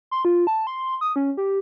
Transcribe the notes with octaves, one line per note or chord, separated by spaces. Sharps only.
C6
F4
A5
C6
D#6
C#4
G4